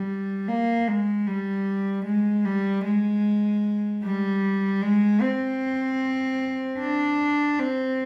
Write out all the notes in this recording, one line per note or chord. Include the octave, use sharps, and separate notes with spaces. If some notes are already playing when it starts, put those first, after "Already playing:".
Already playing: G3
A#3
G#3
G3
G#3
G3
G#3
G3
G#3
C4
D4
C4